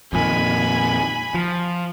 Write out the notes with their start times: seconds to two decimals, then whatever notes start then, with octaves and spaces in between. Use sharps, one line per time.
0.13 F2 A#2 D#3 G#5 B5
1.34 F3